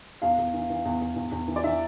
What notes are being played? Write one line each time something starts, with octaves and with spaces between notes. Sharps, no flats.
E2 F5
E2
E3
E3
E2
E2
E2
E2
E3
D5
E3 E5